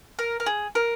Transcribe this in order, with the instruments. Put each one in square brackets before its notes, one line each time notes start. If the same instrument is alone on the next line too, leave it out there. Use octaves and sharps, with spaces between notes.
[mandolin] A#4
A#4
G#4
A#4